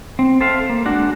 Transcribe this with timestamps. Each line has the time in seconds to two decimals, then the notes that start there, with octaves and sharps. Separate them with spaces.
0.19 C4
0.41 A4 C5 E5 F5
0.70 A#3
0.85 G#3 D4 F#4